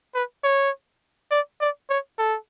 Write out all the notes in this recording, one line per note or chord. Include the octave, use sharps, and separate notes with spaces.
B4
C#5
D5
D5
C#5
A4